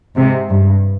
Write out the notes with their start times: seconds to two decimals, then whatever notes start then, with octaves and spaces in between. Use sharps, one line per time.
0.16 G#2 C3
0.49 G2